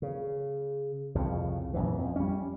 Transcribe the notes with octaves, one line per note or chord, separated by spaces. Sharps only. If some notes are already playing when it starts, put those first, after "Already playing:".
C#3
C2 F2 A2 C#3
A#1 F#2 E3
F2
G3 C#4